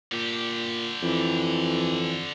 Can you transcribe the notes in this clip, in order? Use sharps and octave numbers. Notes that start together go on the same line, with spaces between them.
A#2 D3 G4
F2 E3